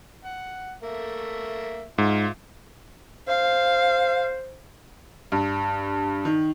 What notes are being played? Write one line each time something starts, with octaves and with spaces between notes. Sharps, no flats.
F#5
A3 A#3 E5
G#2 F4 E5
C5 F5
G2
D#3